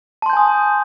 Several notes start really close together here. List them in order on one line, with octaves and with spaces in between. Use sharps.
A5 C6 G6 G#5 D#6